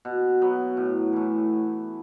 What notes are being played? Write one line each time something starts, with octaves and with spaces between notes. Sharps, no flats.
B2
F#3 B3
A2
E3 A3